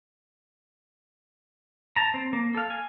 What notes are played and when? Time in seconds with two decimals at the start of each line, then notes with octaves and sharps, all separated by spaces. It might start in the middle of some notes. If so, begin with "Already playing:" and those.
1.96 A5 A#5
2.14 C4
2.33 A#3
2.55 A4 F5
2.70 G#5